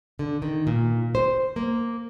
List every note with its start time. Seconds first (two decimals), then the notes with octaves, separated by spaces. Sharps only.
0.19 D3
0.42 D#3
0.67 A#2
1.15 C5
1.56 A#3